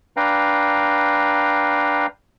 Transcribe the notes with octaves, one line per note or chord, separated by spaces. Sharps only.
D4 B4 F5 G5 A#5